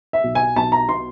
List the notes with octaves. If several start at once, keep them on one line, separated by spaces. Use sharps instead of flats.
E5
B1
G#5
B1 A5
A#5
B2 C6